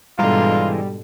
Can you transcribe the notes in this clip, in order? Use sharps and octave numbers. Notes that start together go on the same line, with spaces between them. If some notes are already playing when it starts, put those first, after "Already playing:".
G#2 B2 D3 E3 G3 G#3 F4 A#5